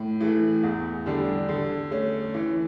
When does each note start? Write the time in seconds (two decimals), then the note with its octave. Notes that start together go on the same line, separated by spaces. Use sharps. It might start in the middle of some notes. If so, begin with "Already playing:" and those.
Already playing: A2
0.20 E3 A3
0.63 E2
1.06 D3 G3 D4
1.49 D3
1.91 A3 C#4
2.34 E3